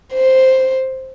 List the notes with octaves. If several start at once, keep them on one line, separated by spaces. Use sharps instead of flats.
C5